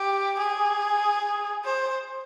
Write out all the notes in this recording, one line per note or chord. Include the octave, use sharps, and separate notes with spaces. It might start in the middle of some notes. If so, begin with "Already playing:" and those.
Already playing: G4
G#4
C5